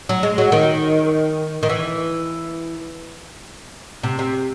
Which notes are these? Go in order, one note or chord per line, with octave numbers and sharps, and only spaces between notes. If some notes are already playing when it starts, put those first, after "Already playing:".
F#3
G#3
F#3
D#3
D#3
E3
C3
C3